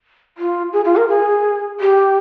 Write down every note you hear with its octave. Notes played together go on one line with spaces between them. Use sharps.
F4
G#4
F4
A#4
G#4
G4